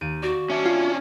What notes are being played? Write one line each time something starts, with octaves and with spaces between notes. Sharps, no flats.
D#2 D7 D#7
F#4 D5
C#4 D4 E5 G#6
F4